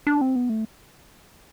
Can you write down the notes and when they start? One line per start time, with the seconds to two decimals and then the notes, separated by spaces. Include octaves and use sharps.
0.07 D4
0.21 C4
0.36 B3
0.49 A3